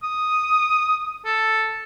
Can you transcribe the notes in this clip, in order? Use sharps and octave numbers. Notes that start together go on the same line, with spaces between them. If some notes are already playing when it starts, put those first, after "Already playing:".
D#6
A4